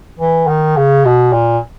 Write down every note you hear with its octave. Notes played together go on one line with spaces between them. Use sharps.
E3
D#3
C#3
B2
A#2